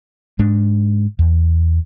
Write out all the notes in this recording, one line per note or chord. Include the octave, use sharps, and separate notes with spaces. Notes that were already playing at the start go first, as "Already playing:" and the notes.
G#2 G#3 D4
E2